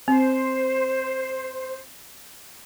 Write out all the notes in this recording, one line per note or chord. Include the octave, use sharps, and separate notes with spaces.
C4 C5